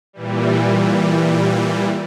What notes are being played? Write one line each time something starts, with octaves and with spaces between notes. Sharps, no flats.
A#2 E3 G3